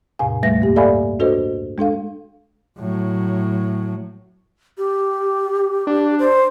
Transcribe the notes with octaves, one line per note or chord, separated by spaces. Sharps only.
E2 A2 C3 F5 G#5
D#2 G3 A3 B4 E5 A#6
G2 A#3 G4
A4 D5 E5 F5 G#5 B5
D4 F#4 A4 B4 C5 D#5
G#3 D4 A4 F5
A2 F#3
G4
D4
C5